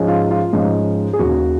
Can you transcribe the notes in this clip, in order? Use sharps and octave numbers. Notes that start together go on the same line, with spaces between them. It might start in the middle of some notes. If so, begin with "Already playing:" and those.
Already playing: G#2 F3 G#3 C#4
F4
F4
G#2 F3 G#3 C#4
G#4
D#2 C#3 F#3 F#4